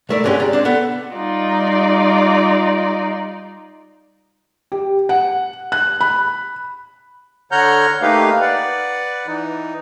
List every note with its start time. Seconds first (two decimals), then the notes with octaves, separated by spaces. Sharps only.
0.09 C2 A3 A#4 D5
0.24 G#2 D3 G#3 C#4 G4
0.39 G#4 D5 A#5
0.53 C4 D4
0.65 B3 A4
1.13 G3 D#4 F4 D5
4.72 G4
5.09 F#5
5.72 F#6
6.01 B5
7.52 D3 C#5 F#5 A#5 F6 G6
8.02 A3 A#3 D#4 G4 B4 F5
8.41 B4 D5 F#5
9.27 E3 D#4